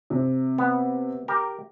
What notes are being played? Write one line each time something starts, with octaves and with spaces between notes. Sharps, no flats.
C3
B3
G4 A#4